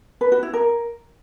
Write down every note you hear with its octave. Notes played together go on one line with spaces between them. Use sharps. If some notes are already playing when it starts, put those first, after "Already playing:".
B4
F#4
E4
A#4